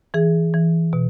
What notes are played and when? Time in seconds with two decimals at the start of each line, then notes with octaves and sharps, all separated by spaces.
0.14 E3 G#4
0.54 E3
0.93 B2